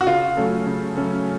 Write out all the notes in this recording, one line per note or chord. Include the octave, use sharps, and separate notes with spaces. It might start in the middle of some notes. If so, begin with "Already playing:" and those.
F#4
C#3 F4
F#3 A3 C#4 A4
C#3
F#3 A3 C#4 A4